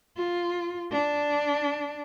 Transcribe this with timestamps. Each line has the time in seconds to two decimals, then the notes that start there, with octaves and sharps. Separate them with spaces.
0.17 F4
0.92 D4